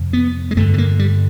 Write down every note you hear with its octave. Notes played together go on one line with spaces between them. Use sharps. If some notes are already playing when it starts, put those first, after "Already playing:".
Already playing: F2 C3
B3
G#3
G2 D3 A3
A3
A#3
G3